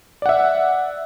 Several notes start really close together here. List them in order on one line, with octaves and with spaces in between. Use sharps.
D5 F#5 E5